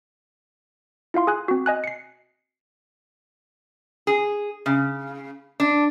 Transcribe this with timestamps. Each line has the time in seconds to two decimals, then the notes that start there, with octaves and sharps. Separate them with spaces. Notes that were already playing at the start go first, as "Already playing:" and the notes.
1.14 E4 F4 F5 C6
1.27 G#4 G#5 F#6
1.48 C4 F#4
1.66 D#5 G#5 F#6
1.84 C7 C#7
4.07 G#4
4.66 C#3
5.60 D4